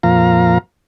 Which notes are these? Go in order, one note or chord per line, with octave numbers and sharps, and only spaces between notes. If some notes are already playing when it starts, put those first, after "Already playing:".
F2 A#2 F3 F5 A#5